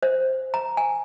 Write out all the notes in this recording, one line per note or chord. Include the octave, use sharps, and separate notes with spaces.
C5
A#5
G#5